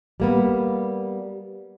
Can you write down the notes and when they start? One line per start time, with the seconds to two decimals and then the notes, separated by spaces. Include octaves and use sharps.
0.20 G3 A#3 B3